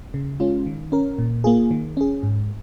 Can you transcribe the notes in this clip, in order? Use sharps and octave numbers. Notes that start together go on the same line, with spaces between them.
C#3
G#3 C#4 F4
D#3
C#4 A#4
A#2
A#3 F4 G#4
D#3
C#4 G#4
G#2